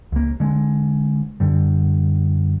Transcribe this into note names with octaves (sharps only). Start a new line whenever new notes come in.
C#2 A#3
D3 G#3
F#2 D3 G3